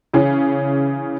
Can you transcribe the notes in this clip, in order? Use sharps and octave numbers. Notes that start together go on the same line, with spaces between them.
C#3 E3 C#4 G#4